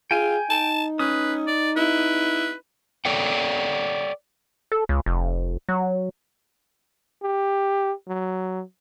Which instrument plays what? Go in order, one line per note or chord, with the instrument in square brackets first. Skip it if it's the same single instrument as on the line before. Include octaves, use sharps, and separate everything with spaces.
[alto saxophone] F4 [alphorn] G#4 [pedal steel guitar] G5 G#5
[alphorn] D#4 [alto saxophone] A5
[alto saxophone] C#4 [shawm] B4 [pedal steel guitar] D#6
[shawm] D5
[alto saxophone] E4 [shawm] B4
[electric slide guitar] A4 C#5 D5 G5
[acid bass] A4
C#2
F1
F#3
[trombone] G4
F#3